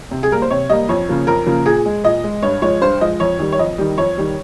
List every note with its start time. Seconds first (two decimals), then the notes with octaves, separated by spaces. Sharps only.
0.11 C3
0.23 G#4
0.31 G3 A#3 A#4
0.42 C5
0.50 C3 C#5
0.70 G3 A#3 D#5
0.89 F2 C#5
1.08 C#3 F3 A#3
1.27 F2 A#4
1.46 C#3 F3 A#3
1.65 A#2 G#4
1.85 G#3
2.04 A#2 D#5
2.24 G#3
2.43 G2 C#5
2.62 F3 G#3 C#5
2.81 G2 C5
3.01 F3 G#3 D#5
3.20 F2 C#5
3.39 D#3 G3
3.52 C#5
3.59 F2 D#5
3.78 D#3 G3
3.97 F2 C#5
4.17 D#3 G3